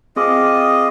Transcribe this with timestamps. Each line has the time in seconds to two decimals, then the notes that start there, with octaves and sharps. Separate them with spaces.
0.16 C4 F4 G#4 D#5 D6